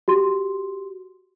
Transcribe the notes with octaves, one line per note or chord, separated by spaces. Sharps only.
F#4 G4 C6